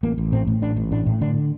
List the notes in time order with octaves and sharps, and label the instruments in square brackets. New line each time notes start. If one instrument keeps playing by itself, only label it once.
[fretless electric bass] A1 A#3
A1
A2 C4
A2
A1 D4
A1
A2 D4
A2
D3 D4